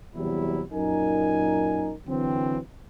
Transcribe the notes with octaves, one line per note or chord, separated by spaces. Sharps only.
E2 C3 F#3 G3 E4
F#2 A#2 D#4 A#4 G#5
D3 E3 F#3 C4